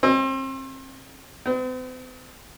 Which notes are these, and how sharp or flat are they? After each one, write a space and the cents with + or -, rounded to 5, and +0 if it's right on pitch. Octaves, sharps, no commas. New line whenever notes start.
C4 +35
C4 -45